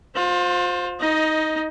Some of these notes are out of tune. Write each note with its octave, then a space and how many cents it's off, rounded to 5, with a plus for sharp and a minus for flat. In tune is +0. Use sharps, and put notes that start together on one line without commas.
F4 +35 C5 +0
D#4 +20 D#5 +0